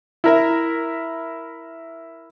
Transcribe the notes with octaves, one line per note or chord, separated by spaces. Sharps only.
E4 A#4 E5